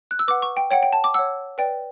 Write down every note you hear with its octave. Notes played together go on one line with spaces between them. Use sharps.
F#6
E6
B4 F#5 D6
C#6
G5
C#5 F#5 G5
G5
A5
D6
C#5 F#5 E6
B4 D5 G5